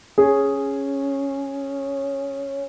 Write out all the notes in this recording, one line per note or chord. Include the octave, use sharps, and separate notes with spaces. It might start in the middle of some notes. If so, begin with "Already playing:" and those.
C#4 G#4